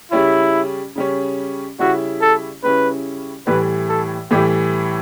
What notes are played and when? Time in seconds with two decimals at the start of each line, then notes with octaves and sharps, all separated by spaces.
0.11 C#3 G3 C#4 E4
0.95 C#3 G3 C#4
1.79 C#3 G3 C#4 E4 F#4
2.21 A4
2.63 C#3 G3 C#4 E4 B4
3.47 A2 E3 G3 B4
3.89 A4
4.31 A2 E3 G3 G4